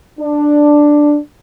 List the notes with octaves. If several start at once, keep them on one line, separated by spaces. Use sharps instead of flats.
D4